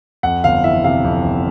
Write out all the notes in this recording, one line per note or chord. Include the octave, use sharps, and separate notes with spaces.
F2 F#5
G1 F5
E3 E5
C3 F5
F2
G1